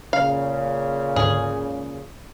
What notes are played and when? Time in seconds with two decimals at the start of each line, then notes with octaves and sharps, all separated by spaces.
0.13 A#2 C#3 F5
1.16 D2 G#2 G#4